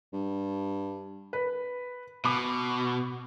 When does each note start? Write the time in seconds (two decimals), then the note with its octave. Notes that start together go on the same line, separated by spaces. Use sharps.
0.13 G2
1.33 B4
2.25 B2 B5 D6